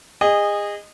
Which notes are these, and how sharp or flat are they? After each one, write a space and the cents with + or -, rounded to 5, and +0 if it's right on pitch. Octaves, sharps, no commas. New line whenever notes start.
G#4 -30 D#5 -15